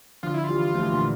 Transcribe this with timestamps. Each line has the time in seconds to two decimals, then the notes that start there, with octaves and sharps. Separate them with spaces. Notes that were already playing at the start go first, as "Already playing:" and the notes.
0.23 D3 F3 F4
0.34 E4
0.44 F4
0.49 E3 G3
0.74 F3 A3
0.83 E3
0.92 A#2 D3